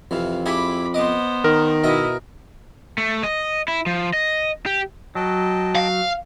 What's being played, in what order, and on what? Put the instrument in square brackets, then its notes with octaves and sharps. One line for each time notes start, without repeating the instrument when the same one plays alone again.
[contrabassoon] F2 [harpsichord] C3 E3 [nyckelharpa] F5
[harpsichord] E4 G4 G#4 [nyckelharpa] B5 D6
[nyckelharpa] B3 C5 [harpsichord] D#5 D6
[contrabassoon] D#3 [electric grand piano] A#4
[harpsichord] B2 E5 A#5 [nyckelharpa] E4 D#5
[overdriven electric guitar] A3
D#5
E4
F3
D#5
G4
[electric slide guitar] F#3 [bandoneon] D#5 G5 A5
[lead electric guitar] F5